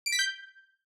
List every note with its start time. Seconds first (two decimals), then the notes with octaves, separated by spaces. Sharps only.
0.06 D7
0.12 B6
0.19 G6